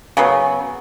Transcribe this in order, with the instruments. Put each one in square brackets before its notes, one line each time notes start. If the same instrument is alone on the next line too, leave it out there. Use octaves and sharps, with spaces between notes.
[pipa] C#3 F#3 B3